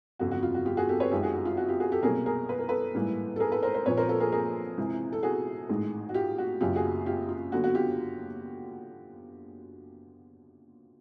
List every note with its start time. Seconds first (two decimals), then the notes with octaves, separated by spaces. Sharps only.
0.19 G1 F2 C#3 F#4
0.31 F#4
0.43 F4
0.54 F#4
0.66 F4 G4
0.77 F#4 G#4
0.89 G4 A4
1.00 B4 C#5
1.11 F#2 D#3 G#3 F4 G4
1.23 F#4 G#4
1.34 F#4
1.45 F4
1.57 F#4
1.68 F4 G4
1.80 F#4 G#4
1.92 G4 A4
2.03 C2 B2 F#3 A#3 G#4 A#4
2.26 G#4 A#4
2.49 B4
2.59 A#4
2.69 A4 B4
2.95 A1 G#2 E3 G3 A#3
3.36 A4
3.40 G#4 A#4
3.52 A4 B4
3.63 A#4 C5
3.74 A#4 C5
3.86 A#1 A#2 F3 B4 C#5
3.97 A#4 C5
4.09 A4 B4
4.20 G#4 A#4
4.32 G#4 A#4
4.77 C#2 C3 E3
5.13 A4
5.23 F#4 G#4
5.69 A1 G#2 D#3 G#3
6.09 F#4
6.14 F4 G4
6.38 F#4
6.60 F#1 F#2 C#3 F#3 F4 G4
6.76 F#4 G#4
7.06 F4 G4
7.29 F4
7.52 D#2 D3 F#3 B3 F#4
7.64 F#4
7.75 F4 G4